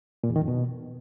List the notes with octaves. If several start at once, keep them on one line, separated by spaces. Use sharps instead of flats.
A#2
E2
D#3
F2
B2